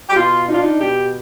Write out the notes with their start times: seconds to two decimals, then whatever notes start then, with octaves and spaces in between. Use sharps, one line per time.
0.09 G4
0.16 B2 F4
0.47 D4 D#4
0.54 F4
0.62 D#4
0.78 B2 G4